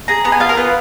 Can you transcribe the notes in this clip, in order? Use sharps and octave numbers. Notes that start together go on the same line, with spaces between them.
G#4 A#5
B3 A#5
G#5
F4 F5
A#4
B3 B4